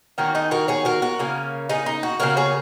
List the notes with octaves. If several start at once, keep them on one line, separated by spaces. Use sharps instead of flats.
D#3 A#3 C#4 F#4
D#4 G#4
F#4 A#4
G#4 C#5
F#4 A#4
F#4 A#4
C#3 A#3 C#4
D#4 G#4
D#4
F#4
C#3 A#3 C#4 F#4 A#4
G#4 C#5